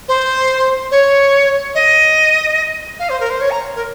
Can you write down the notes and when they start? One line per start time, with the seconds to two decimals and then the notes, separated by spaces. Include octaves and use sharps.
0.08 C5
0.91 C#5
1.75 D#5
2.99 F5
3.09 C5
3.20 A#4
3.30 C5
3.41 C#5
3.51 A#5
3.76 A#4